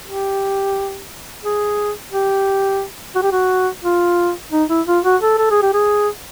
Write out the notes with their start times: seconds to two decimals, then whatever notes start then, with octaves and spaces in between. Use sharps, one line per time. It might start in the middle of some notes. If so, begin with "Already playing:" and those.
0.06 G4
1.44 G#4
2.11 G4
3.15 F#4
3.23 G4
3.32 F#4
3.84 F4
4.52 D#4
4.69 E4
4.87 F4
5.04 F#4
5.22 A4
5.38 A4
5.51 G#4
5.62 G4
5.73 G#4